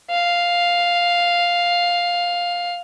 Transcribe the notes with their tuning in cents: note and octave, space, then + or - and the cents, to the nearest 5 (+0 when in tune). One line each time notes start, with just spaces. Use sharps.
F5 +5